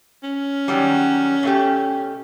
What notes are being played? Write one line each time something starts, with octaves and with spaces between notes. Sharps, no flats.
C#4
D#3 F#3 G3
B2 A3 G4